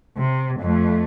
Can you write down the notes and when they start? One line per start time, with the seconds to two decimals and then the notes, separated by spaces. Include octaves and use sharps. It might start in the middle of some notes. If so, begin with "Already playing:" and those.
0.18 C3
0.60 F2 A3